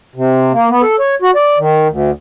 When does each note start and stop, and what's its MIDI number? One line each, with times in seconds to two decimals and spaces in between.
0.16 0.52 48
0.52 0.69 58
0.70 0.82 59
0.82 0.96 69
1.00 1.15 73
1.22 1.31 66
1.36 1.58 74
1.58 1.88 51
1.90 2.11 38